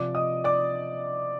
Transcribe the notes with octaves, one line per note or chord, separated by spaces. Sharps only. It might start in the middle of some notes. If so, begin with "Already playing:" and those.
Already playing: C3 F3 D5 D6
D#5 D#6
D5 D6